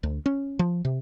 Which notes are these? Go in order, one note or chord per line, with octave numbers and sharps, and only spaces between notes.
D2
C#4
F3
C3